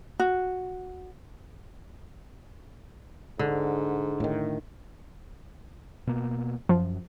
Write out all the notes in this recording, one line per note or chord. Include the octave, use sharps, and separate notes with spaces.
F#4
G#2 D3
A2 D#3
B2 A#3
F#2 F3